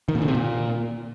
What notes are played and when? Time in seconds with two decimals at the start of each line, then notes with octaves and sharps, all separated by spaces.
0.09 D#3
0.15 A#2
0.22 D3
0.28 C3
0.35 A#2